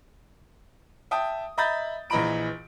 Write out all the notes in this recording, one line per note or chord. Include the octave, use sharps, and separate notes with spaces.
E5 G5 A5 D#6
D#5 E5 A#5 B5 G6 A6
A#1 E3 D#5 A#5 B5 D7